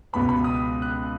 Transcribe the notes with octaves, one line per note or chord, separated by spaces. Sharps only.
C#2 B2 G#3 B3 B5
B5
D#6
F#6